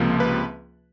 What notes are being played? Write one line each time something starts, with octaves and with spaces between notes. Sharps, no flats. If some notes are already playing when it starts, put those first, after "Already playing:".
Already playing: C#2 C3 F3 A#3
B4